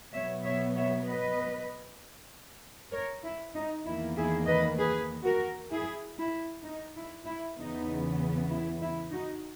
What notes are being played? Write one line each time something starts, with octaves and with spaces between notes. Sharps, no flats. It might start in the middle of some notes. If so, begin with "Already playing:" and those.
B2 F#3 B3 C#5 E5
C#5 E5
C#5 E5
B4 D#5
A#4 C#5
E4
D#4
E2 D#3 A#3 E4
E4 G#4
B4 D#5
G#4 B4
F#4 A#4
E4 G#4
E4
D#4
E4
E4
E2 C#3 E3 B3 D#4
E4
E4
D#4 F#4